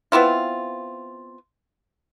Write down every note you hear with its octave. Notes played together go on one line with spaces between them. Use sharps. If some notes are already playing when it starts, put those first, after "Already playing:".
B3 C4 E4 F4